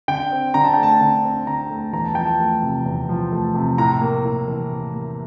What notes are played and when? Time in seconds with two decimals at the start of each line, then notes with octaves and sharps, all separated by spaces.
0.08 D3 G5
0.31 C4
0.54 D3 A#5
0.64 A5
0.74 A3 G5
0.83 A5
1.00 D3 A#5
1.24 C4
1.47 D3 A#5
1.70 A3
1.93 E2 A#5
2.04 A5
2.15 F3 G5
2.26 A5
2.40 A3
2.63 C3
2.86 E2
3.09 F3
3.32 A3
3.55 C3
3.78 A2 A#5
4.01 A#3
4.24 A2
4.48 E3
4.70 A2
4.94 A#3